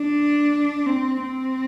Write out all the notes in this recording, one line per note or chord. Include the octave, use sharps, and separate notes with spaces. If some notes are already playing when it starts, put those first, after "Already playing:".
Already playing: D4
C4
C4